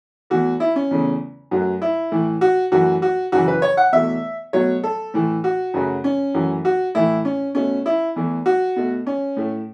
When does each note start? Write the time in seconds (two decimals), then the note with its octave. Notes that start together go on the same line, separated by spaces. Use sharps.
0.30 E2 E3 A3 F#4
0.60 E4
0.76 C#4
0.91 E2 C#3 A3
1.51 F#2 F#3 A3
1.82 E4
2.11 A2 E3 A3
2.41 F#4
2.72 F#2 E3 A3 F#4
3.02 F#4
3.32 F#2 C#3 E3 F#4
3.48 B4
3.62 C#5
3.77 F#5
3.92 E2 B2 A3 E5
4.53 B2 F#3 A3 C#5
4.84 A4
5.14 A2 E3 A3
5.44 F#4
5.74 F#2 C#3 F#3 A3
6.04 C#4
6.34 F#2 E3 A3
6.65 F#4
6.95 A2 E3 A3 E4
7.25 C#4
7.55 B2 A3 C#4
7.86 E4
8.16 E2 E3 A3
8.46 F#4
8.76 B2 A3
9.07 C#4
9.37 A2 A3